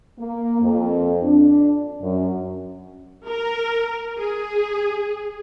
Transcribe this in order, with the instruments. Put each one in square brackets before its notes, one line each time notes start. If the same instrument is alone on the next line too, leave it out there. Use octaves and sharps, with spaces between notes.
[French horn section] A#3
F2
D4
F#2
[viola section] A#4
G#4